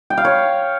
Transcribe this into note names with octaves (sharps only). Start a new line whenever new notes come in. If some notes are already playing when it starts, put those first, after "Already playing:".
G5
F5
C#5